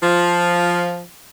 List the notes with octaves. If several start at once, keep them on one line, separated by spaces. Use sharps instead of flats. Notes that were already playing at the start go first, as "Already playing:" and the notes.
F3